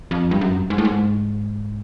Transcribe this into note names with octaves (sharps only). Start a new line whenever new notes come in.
F2
G2
F#2
G#2
A2
G#2